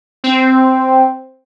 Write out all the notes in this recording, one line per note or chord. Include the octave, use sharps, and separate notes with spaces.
C4